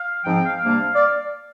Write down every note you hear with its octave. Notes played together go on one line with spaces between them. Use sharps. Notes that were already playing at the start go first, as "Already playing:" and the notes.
Already playing: F5
G#2 F3 C4 G5
F5
C3 G3 A#3 D4
D5